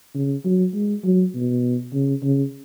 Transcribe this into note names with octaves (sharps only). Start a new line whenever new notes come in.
C#3
F#3
G#3
F#3
B2
C#3
C#3